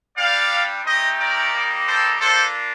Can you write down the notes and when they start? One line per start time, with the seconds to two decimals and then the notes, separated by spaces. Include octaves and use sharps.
0.16 G3 D4 G4 D5 F5
0.84 A3 D#4 G4 C5 D#5
1.18 A#4 D5
1.53 G3 A#3 D#4 G4
1.86 A4 C5
2.20 A#3 D4 F4 A4 C5